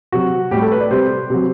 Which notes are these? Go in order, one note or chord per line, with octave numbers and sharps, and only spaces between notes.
C3 F#3 F#4
A2 G3 G4
A4
B4
D5
C3 G3 C5
C3 F#3